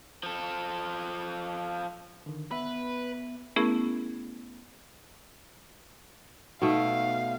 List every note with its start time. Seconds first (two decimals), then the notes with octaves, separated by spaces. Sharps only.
0.23 F3 A4
2.26 D3 D#3
2.51 B3 B4 E5
3.56 A3 B3 C#4 E4 G#4 A#4
6.62 B2 A3 D#4 F5